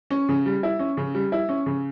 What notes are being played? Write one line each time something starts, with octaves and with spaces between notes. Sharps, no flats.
C#4
C#3
G3
E4
C#4
C#3
G3
E4
C#4
C#3